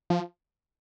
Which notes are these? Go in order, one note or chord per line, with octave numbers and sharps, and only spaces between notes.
F3